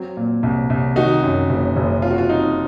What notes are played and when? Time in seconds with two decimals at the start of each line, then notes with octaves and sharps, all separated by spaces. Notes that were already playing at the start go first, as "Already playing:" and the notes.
Already playing: F#3 C4
0.17 A#2
0.43 C2
0.70 C2
0.96 D#3 D#4 F#4
1.23 F#2
1.50 F#1
1.77 F#1
2.02 C3 F4
2.11 F#4
2.18 F4
2.29 F2 D#4